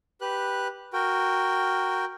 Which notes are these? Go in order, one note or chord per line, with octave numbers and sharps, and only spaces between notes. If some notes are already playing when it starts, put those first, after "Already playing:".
G4 B4 F#6
F#4 A#4 G5